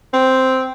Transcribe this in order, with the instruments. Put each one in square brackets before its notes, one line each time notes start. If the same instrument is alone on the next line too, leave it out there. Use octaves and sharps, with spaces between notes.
[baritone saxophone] C4